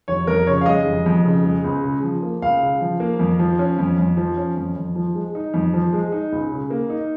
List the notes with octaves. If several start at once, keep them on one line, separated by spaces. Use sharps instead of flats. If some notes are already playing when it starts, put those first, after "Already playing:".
F1 C#5
F2 A#4
C#3 C#5
F5
G#3 D#5
F1
F2
C#3
G#3
C#2
C#3
F3
A#3
C#2 F5
C#3
F3
A#3
F2
F3
C#4
F2
F2
F3
C#4
F2
F2
F3
G#3
D#4
F2
F3
G#3
D#4
C#2
C#3
A#3
D#4